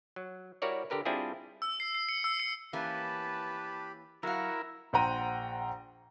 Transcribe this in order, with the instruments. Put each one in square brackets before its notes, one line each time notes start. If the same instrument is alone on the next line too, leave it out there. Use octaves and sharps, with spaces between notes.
[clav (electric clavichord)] F#3
G3 E4 F#4 A#4 C#5 D5
D3 G4 A#4 B4
G3 C4 D4 E4 F4 G#4
[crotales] E6
C7
C7
C#7
E6
C#7
[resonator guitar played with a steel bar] E3 A#3 C#4 [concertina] G4 B5 [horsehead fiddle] B4 A5
[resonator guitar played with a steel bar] F#3 F5 [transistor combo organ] E4 A#4 [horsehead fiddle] F#4
[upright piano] A#1 C5 F#5 G5 A#5 D#7